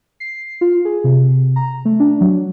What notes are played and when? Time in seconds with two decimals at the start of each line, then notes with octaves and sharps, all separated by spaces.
0.20 C7
0.61 F4
0.85 G#4
1.04 C3
1.56 A#5
1.85 A3
2.00 D4
2.21 F#3